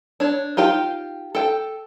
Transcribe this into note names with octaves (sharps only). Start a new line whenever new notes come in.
D4 C#5
D#4 F4 G4 G5
A4 G5